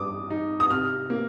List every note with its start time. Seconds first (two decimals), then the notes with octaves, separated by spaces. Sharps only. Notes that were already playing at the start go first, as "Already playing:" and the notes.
Already playing: G2 D6 D#6
0.30 D#4
0.60 D#6
0.70 C3 F6
1.10 A#3